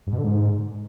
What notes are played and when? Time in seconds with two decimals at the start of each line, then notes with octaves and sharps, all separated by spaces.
0.07 G2
0.12 B2
0.18 D3
0.24 G#2